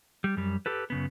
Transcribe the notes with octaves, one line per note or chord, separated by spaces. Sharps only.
G3
F#2 G3
G4 A4 B4
F#2 C#3 B3